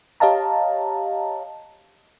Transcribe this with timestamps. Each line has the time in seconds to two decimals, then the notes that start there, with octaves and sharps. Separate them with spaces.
0.20 G4 C#5 D#5 F5 A5 A#5